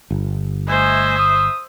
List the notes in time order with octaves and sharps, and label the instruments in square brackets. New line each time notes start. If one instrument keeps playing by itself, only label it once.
[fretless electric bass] G1
[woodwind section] A3 D#5 G#5 [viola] C5 E5
[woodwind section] D#6